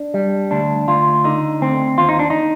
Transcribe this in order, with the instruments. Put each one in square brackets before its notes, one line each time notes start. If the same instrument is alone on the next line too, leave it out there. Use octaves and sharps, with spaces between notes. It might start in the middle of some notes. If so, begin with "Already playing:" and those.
Already playing: [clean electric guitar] D4
G3
D2 D4
D2 F4
D3 D#4
D2 C4
D#2 F4
D#4
D4
D#4